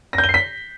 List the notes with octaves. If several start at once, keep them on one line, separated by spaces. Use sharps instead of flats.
A#6
G6
G7
C7
B6